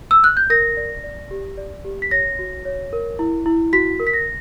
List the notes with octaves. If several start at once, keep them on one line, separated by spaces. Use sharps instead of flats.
E6
F#6
G6
A#4 A#6
D5
D5
G4
D5
G4
B6
C#5 A#6
F#4
C#5
A#4
E4
E4
F#4 B6
A#4
B6
A#6